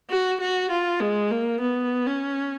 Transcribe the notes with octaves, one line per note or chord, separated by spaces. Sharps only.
F#4
F#4
F4
G#3
A#3
B3
C#4